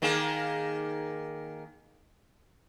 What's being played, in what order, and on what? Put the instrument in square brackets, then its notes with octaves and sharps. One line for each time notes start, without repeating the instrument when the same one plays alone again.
[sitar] D#3 A#3 G#4